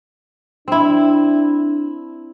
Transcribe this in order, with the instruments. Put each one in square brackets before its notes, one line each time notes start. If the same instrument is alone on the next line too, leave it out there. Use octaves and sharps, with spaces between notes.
[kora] C4 E4 [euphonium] D4